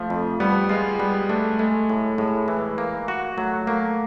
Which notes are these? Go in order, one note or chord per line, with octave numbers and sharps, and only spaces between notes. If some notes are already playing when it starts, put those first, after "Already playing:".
Already playing: F3 A3
F2
G3 B3
G#3 F4
G3 B3
A3 D4
G#3 A3
A2
A2 G#3
E3
A#3
F#4
F#3 A3
A3 A#3